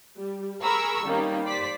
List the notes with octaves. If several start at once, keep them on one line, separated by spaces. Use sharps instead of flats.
G3
G#4 A#4 A#5 B5 C#6 E6
D#3 G3 A#3 C#4
C5 D5 B6